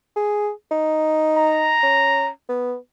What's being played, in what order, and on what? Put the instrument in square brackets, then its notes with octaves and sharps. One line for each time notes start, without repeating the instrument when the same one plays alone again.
[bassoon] G#4
D#4
[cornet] A#5
[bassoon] C#4
B3